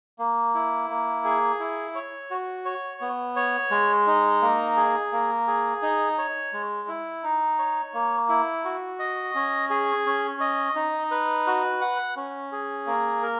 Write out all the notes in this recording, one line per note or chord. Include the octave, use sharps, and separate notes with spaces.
A#3
E4
A#3
G#4
E4
C#5
F#4
C#5
B3
C#5
G#3
D#4
A#3
G#4
A#3
G#4
D#4
C#5
G#3
E4
D#4
C#5
A#3
E4
F#4
D#5
C#4
G#4
C#4
D#5
D#4
B4
F#4
F#5
C#4
G#4
A#3
A#4